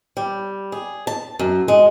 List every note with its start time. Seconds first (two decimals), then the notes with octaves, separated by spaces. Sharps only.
0.17 G3
0.72 G#4
1.07 A5
1.39 F#2
1.68 G#3